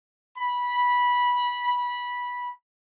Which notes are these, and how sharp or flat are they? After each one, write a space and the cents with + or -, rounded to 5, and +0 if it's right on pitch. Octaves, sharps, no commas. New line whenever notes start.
B5 -15